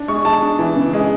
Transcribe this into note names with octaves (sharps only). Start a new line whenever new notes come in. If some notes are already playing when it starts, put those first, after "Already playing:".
Already playing: D4
G#3 C#6
G#3 A5
D4
E3
C#3
G#3